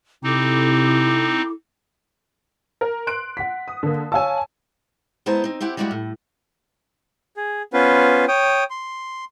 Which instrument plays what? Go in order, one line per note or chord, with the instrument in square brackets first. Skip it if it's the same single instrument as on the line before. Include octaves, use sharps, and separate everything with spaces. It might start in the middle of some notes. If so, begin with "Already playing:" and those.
[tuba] C3 [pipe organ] C4 D#4 [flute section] E4 A4 D6
[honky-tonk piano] A#4
C6 F#6 D7
[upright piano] F#5 B6
[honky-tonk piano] D#6
D3 A#3
[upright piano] C#5 F5 E6 [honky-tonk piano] G#5 A5
[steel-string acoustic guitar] G#3 B3 E4 C5 A5 A#5
C4 D#4
C4 E4 G4 F#5
G3 G#3 A#3 E4 F#4 G4
A2
[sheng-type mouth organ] G#4
B3 C#4 F4 B4 C5
C#5 G5 D#6
C6